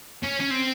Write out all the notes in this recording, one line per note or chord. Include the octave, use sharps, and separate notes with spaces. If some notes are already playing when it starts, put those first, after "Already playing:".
C#4
C#4
C4